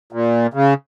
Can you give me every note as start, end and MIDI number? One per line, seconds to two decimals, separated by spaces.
0.12 0.47 46
0.54 0.74 49